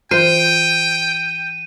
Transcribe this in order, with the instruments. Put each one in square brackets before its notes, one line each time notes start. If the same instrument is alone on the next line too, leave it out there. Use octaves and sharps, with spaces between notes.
[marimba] E3 F4 [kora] C5 [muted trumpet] G5 [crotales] D#7